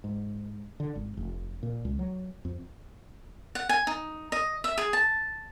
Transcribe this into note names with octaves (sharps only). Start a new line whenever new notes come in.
G#2
D3
G#1
F1
A#2
C#2
F#3
F2
F#5
G#5
D#4
D#5
E5
G#4
A5